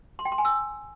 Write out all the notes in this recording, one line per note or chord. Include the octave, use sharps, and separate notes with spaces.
C6
G5
C6
G#5
E6